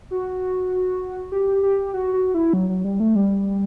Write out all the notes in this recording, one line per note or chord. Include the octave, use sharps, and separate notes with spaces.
F#4
G4
G4
F#4
F#4
E4
F#3
F#3
G3
A3
G3